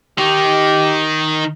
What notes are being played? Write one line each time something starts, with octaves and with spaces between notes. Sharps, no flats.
D#3 D#4 G4